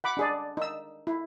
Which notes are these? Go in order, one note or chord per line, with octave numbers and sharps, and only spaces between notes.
F#5 B5 D6
D4 G#4 D5
D#4 E6
E4